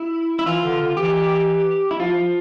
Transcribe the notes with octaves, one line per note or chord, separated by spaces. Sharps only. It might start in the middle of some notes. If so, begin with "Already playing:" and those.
Already playing: E4
E4
E3 F4
D3
D3
E3 G4
E4
F3 F4
F3